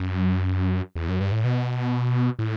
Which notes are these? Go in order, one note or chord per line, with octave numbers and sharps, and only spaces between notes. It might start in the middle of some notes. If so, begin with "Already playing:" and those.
Already playing: F#2
E2
F#2
G2
A2
B2
A2